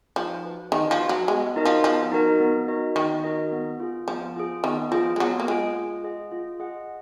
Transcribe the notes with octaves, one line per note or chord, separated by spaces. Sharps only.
F3 D#4
F#4 B4
D#3 D#4
F3
F#4 B4
F#3
G#3 B3
D#4 F#4 A#4 D#5
F3
F3 B3
D#4 F#4 A#4 D#5
B3
D#4 F#4 A#4 D#5
D#3 B3
D#4 F#4 A#4 D#5
B3
F4 G#4
F3 B3
F4 G#4
D#3 B3
F3 F4 G#4
G#3
F#3 B3
A#3
G#3 F4 G#4
F4
G#4 D#5 F#5
F4
G#4 D#5 F#5